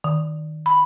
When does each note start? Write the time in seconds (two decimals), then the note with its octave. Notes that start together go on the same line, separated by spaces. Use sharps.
0.04 D#3
0.66 B5